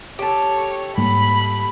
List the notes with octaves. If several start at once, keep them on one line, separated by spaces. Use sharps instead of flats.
G4 A4 C#5
G#2 G3 A#3 B5